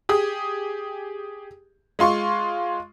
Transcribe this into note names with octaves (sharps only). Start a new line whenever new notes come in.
G4 G#4 D#6
G#3 F4 C6 C#6